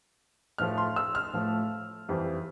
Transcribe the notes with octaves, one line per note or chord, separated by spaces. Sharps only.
A2 F3 A3 F6
C6
E6
F6
A2 F3 A3
F2 E3 G3 C4